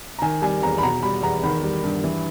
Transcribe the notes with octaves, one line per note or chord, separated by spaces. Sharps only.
A#5
D#3 G#5
G3 G#5
E2 A#5
B5
B2 A#5
G3 B5
E2 A#5
D#3 B5
G3
G2
E3